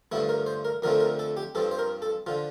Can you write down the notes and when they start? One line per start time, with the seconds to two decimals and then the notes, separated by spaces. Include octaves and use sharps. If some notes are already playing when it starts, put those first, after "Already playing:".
0.12 G2 D3 F3 A3 E4
0.29 A#4
0.46 C5
0.65 A#4
0.82 F2 D3 F3 A3 C4 A#4
1.00 A#4
1.19 A4
1.37 G4
1.55 G2 F3 C4 A4
1.71 C5
1.79 A#4
2.02 A4
2.27 D3 F3 F4